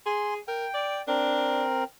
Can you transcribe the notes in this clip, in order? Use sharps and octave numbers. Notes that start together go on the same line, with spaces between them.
G#4 G#5 C6
A#4 G5
D5
C4 D4 A#4